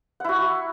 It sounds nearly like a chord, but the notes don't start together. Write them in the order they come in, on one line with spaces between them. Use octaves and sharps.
F#5 E4 F#4